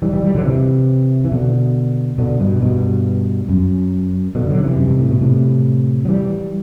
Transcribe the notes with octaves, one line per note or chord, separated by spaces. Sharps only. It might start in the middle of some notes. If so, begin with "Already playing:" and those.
E3 G3
E3 G3
E3 G3
D3 F#3
C3 E3
E3
B2 D3
B2 D3
G2 B2
G2 B2
F#2
B2 D3
D3 F#3
C3 E3
F#2
G2
A2
B2
A2 C3
F#3
E3 G3